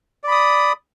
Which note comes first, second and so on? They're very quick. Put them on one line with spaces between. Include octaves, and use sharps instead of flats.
D5 B5 D#6